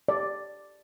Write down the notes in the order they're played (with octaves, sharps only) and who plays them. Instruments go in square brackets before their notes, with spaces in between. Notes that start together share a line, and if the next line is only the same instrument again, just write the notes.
[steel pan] D5